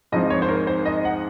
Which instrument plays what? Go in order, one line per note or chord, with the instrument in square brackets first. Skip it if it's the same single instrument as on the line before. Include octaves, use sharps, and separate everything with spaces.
[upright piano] G#2 F3 C4 D#5
C#5
C5
A#4
C5
D#5
F#5